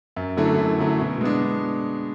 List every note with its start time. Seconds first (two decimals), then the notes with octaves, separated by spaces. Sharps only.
0.16 F#2
0.37 D3 F#3 A3 E4
0.58 F#2
0.79 D3 F#3 A3 E4
1.00 B2
1.21 G#3 B3 D4